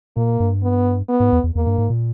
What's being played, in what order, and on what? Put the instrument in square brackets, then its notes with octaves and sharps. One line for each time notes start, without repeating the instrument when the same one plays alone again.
[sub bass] A#2 [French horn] A#3
[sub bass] G2
[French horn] B3
B3
[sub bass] G#2
E2
E2
[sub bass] E2 [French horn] A#3
[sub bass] G2
G#2
A#2